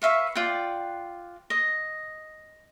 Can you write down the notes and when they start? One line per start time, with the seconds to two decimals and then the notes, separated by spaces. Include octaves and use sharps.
0.02 B4 E5 F5 C#6
0.35 F4 D5 F#5 G5
1.50 D#5